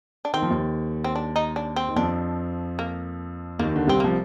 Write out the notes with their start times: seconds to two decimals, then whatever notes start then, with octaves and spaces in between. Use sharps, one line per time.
0.25 D4
0.34 D#3 C4
0.42 F3
0.50 D#2 D#3
1.04 C4
1.16 D4
1.36 D#4
1.56 D4
1.76 C4
1.89 D#3
1.96 F2 F3 D4
2.79 A#3
3.59 D#2 D#3 A#3
3.76 D3
3.87 C2 C3 C4
4.00 F3 A#3